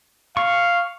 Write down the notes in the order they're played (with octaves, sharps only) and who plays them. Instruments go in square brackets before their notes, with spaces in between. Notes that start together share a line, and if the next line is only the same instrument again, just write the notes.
[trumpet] F5 [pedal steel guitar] C#6